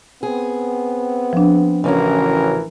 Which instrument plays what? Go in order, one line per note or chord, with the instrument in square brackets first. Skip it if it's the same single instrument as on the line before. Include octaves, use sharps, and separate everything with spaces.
[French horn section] B3 C4 [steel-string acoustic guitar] G#4
[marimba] F3 D4
[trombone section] A1 E3 A#4 [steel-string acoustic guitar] C#3 C#4 F#4